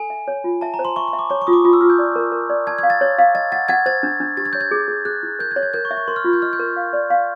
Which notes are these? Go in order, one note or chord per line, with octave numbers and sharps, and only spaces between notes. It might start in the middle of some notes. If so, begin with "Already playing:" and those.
Already playing: A4 G#5
E5
C#5
F4
E5 A5
A#5
C5
C6
E5 C#6
C#6
E5
D6
C#5 C#6
C#6
F4 D#6
D6
F4 D#6
E6
F4 F6
G6
D5
A#4
A#4
D5
A5 G#6
G#6
F5
A6
C#5
F5
D#5 A6
F#5 A6
F#5 G#6
C5 A6
D4
D4
G4 A6
G#6
C#5 G6
G#6
G#4
G#4
G#4 F#6
E4
A#4 G6
G#6
C#5
G#6
A#4 G6
C#6
E5
C#6
A#4 C6
F6
F4
G6
D#5 F6
G6
A#4
F5
D5
F5